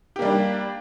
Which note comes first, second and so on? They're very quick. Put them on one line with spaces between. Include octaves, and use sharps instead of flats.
G4 A#3 G3 D4